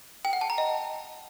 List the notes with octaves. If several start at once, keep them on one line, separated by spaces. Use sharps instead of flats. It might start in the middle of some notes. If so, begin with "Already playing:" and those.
G5
F#5
A5
A#5
D#5